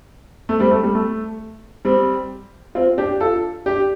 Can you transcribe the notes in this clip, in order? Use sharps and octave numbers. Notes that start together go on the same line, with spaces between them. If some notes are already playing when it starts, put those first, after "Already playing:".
A3
G3 C4
A3
G3
A3
G3 C4
C4 F4
D4 G4
F4 A4
D4 G4